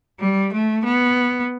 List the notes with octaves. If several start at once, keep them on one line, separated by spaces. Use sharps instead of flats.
G3
A3
B3